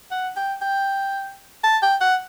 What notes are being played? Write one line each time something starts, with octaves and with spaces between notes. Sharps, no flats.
F#5
G5
G5
A5
G5
F#5